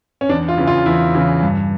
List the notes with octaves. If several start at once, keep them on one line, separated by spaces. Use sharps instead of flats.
C#4
E2 D4
F4
C#3 E3
F4
E2 E4
C#3 E3
G2